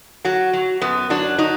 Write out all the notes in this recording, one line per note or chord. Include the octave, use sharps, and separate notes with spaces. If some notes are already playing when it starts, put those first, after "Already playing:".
F#3 F#4
F#3
F#2 B3
F#3 D4
F#3 D#4